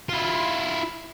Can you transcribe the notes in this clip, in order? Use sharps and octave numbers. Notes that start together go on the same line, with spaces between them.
E4 F4